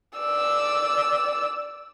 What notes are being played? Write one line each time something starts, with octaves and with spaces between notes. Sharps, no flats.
D5 E6